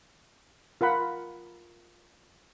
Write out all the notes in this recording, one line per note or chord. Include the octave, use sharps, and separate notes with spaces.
F4 A#4 F#5 B5